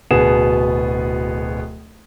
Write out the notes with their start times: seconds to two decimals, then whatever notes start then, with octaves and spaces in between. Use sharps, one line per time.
0.11 D1 B2 B3 G#4 E7